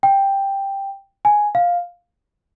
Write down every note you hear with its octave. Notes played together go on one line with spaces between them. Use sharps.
G5
G#5
F5